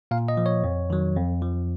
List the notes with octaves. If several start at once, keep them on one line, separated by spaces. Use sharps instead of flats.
A#2 F5
D#5
F3
C#5
F2
D#3 F#3
F2
F3